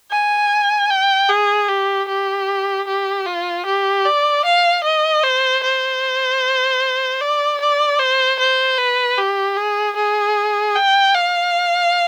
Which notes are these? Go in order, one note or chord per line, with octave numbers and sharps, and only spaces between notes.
G#5
G5
G#4
G4
G4
G4
F4
G4
D5
F5
D#5
C5
C5
D5
D5
C5
C5
B4
G4
G#4
G#4
G5
F5